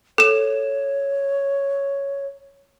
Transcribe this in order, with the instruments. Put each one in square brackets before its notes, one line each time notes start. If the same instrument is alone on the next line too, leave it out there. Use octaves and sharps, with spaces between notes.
[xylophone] A4 E7 [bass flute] C#5